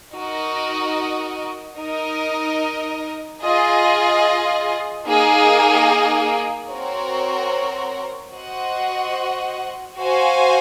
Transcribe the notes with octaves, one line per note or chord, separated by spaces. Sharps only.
D#4 F#4 A#4 D#5
D#4 A#4 D#5
F4 G#4 D#5
A#3 D#4 G#4
C4 F#4 A#4 C#5
F#4 C5 D#5 F#5
F#4 C5 F5 G#5